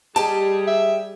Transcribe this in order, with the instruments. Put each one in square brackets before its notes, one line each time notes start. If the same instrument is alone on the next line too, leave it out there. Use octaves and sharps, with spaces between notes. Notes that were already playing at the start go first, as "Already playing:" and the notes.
[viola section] G3 G#4 [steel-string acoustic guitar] G4 D#5 [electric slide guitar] A5
[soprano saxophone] E5